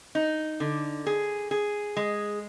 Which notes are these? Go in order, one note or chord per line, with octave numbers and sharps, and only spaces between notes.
D#4
D3
G#4
G#4
G#3